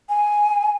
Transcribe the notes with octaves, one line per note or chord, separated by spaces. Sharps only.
G#5